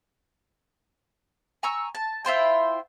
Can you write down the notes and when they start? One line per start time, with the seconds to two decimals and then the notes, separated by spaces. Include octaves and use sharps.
1.63 G#5 A#5 C#6 E6
1.95 A5
2.25 E4 F4 C5 G5